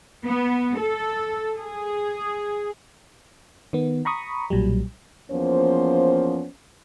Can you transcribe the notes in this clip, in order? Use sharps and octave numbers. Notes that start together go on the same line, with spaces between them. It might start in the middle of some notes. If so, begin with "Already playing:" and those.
B3
A4
G#4
D#3 B3
A#5 B5 C#6 D#6
B1 A#2 F#3 G3
E2 F3 A#3 B3 C#4 C5